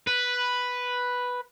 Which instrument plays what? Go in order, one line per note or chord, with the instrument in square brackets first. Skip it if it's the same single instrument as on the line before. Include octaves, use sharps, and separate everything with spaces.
[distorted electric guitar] B4